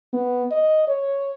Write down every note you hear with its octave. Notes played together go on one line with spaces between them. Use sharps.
B3
D#5
C#5